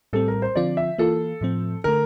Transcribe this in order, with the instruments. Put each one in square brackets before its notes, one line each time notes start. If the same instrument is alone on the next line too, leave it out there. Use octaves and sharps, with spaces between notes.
[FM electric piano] A2 G3 C4 [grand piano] A4
[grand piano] A#4
C5
[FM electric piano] D3 F3 C4 F4 [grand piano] D5
[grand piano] E5
[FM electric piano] E3 A#3 F4 [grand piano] A4
[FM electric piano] A2 F3 C4
[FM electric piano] D3 A3 [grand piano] A#4